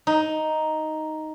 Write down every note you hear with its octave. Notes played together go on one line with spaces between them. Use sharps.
D#4